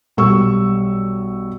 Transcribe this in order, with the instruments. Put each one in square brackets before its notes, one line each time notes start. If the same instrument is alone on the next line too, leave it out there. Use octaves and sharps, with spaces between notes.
[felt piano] B1 G3 C#6 E6